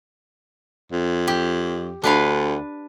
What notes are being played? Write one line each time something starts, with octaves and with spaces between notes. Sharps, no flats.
F2
G4
D2 D4 B4 F5